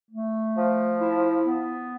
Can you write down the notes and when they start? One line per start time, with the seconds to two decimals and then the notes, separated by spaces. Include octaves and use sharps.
0.11 A3
0.55 F3
0.99 E4
1.42 B3